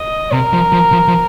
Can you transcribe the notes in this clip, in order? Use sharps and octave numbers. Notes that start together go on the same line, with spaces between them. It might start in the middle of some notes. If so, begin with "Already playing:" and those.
Already playing: D#5
C3 A#4
F3
F3
F3
F3